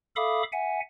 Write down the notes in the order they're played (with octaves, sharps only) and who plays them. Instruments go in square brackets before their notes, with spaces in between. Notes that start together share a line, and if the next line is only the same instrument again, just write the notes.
[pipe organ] A4 E5 F5 B5 D6 D#6
E5 F#5 G#5